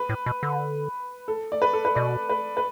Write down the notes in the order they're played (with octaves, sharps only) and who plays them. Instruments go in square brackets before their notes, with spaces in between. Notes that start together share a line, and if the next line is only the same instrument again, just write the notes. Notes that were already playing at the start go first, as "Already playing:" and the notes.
Already playing: [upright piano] B4
[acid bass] A2
B2
D3
[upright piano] A4
D5
B4
A4
B4
[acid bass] B2 [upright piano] D5
[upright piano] B4
B4